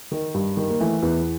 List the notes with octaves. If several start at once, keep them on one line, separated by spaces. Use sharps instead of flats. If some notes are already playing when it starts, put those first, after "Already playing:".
D#3
G2
D#3
A#3
E3 A3
E2 B3